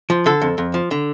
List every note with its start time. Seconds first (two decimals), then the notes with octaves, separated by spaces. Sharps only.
0.10 F3
0.26 D3 A4
0.42 F2
0.58 F2
0.74 F3
0.91 D3